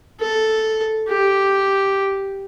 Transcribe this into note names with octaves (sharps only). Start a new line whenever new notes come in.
A4
G4